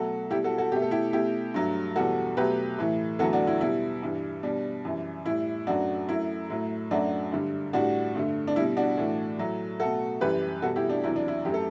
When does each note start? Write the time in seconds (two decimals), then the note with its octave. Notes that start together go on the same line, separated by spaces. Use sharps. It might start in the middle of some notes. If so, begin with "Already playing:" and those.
Already playing: B2 F#3 A3 F#4 A4
0.31 G3 E4 G4
0.35 B2
0.44 F#4 A4
0.58 F#4 A4
0.72 B2 A3 G4
0.82 A4
0.91 E4 G4
1.13 B2 A3 E4 G4
1.54 G2 F#3 A3
1.96 E2 B2 G3 F#4 A4
2.37 B2 F#3 A3 G4 B4
2.79 A2 E3 A3
3.19 E2 D3 F#3 A3 F#4 A4
3.33 D4 F#4
3.47 E4
3.61 B2 G3 E4
4.02 G2 E3 G3
4.43 B2 G3 D4
4.85 F#2 E3 G3
5.26 A2 G3 E4
5.67 F#2 F#3 A3 D4 F#4
6.08 F#2 F#3 A3 E4
6.50 A2 F#3 A3
6.91 F#2 F#3 A3 D4 F#4
7.32 G2 D3 G3
7.73 A2 G3 D4 F#4
8.15 G2 D3 A3
8.47 D4
8.56 B2 G3 E4
8.77 D4 F#4
8.97 A2 E3 A3
9.38 A2 F#3 A3
9.80 B2 A3 F#4 A4
10.21 F#2 E3 G3 G4 B4
10.62 B2 G3 F#4 A4
10.76 E4 G4
10.90 D4
11.04 E2 C3 F#3 E4
11.16 D4
11.28 E4
11.45 F#2 F#3 A3 G4
11.54 A4